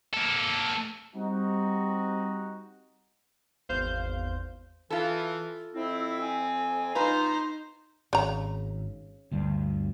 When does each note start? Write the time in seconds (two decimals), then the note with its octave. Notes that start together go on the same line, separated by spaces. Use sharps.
0.14 A#3 A4
1.15 G3 C4 D#4 F#4
3.69 G#1 E2 C5 F5 G6
4.90 E3 F4 A4
5.74 F2 C4 E4
6.21 G#5
6.95 D#4 F4 B4 C5 A#5
8.13 G#1 C#3 A#5
9.31 G1 D2 G2